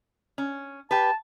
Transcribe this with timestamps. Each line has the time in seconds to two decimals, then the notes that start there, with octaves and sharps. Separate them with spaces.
0.38 C#4
0.91 G4 B4 A5